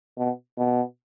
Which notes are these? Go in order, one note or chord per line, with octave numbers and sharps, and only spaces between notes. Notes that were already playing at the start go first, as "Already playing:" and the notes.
B2
B2